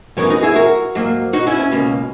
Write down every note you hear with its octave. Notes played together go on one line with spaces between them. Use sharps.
F#2 E3 B3 A#4 C#5
D#4 F#4
E4 G#4
F#4 A#4
G#2 F#3 A#3
D#4 F#4
C#4 E4
C#4
C#2 B2 A#3